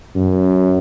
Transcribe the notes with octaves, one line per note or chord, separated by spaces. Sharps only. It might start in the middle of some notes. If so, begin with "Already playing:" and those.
F#2